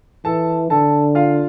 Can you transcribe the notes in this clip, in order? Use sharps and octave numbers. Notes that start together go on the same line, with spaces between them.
E3 A4 A5
D3 A4 A5
F4 F5